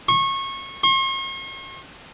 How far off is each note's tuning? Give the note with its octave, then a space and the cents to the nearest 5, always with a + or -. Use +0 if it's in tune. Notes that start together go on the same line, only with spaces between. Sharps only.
C#6 -25
C#6 -45